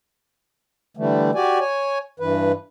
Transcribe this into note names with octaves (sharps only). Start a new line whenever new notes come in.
D3 E3 G3 A3
F#4 G4 D5 G#5
C#5 G#5
G2 E3 B4